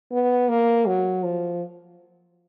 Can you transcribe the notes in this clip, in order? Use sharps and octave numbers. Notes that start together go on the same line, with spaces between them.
B3
A#3
F#3
F3